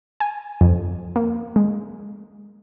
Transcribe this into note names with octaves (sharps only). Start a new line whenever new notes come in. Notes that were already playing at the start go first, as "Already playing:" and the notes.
G#5
F2
A#3
G#3